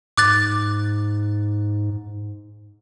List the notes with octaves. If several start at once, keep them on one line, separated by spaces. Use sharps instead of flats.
G#2 D6 F#6 A6